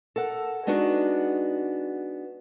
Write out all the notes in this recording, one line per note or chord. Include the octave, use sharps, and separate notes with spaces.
A4 A#4 F#5
G#3 B3 D4 D#4 F#4